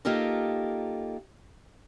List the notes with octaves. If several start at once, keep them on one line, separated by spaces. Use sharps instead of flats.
A#3 D#4 F4 G4 A4 A#4